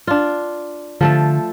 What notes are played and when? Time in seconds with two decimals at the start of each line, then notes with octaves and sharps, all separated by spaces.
0.07 D4 F4
1.01 D3 F3 A3 A4